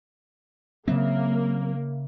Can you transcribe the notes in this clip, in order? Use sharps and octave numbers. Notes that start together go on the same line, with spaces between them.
C#3 F#3 A#3 C4 E5